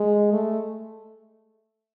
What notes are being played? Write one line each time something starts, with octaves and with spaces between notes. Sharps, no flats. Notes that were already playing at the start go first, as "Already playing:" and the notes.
Already playing: G#3
A3